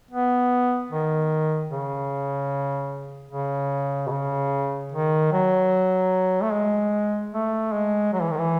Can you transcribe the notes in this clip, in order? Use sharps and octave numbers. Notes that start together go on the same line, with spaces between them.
B3
D#3
C#3
C#3
B2
C#3
D#3
F#3
A3
G#3
A3
G#3
F#3
E3
D#3
E3